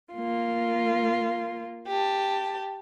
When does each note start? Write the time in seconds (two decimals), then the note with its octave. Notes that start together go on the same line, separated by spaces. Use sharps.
0.13 A#3 F4
1.87 G4 A5